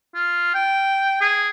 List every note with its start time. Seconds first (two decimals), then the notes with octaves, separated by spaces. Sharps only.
0.15 F4
0.54 G5
1.21 G#4